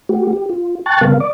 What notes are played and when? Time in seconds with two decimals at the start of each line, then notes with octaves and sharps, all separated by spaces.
0.09 A3 F#4 G4
0.33 G4
0.50 F4
0.86 G5 A5 C#6 F#6 A6
1.01 C#3 G3 B3 A#4 F5
1.20 D5 D6